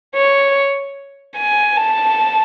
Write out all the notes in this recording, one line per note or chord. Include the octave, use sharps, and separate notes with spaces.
C#5
G#5
A5